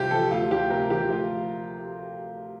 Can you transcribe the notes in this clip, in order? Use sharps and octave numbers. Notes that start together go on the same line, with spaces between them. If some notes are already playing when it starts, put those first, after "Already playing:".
Already playing: C2 C3 F3 F4 G4
F3 A4
D2 F4
D2 G4
C3 A#4
F3 G4
D2 F4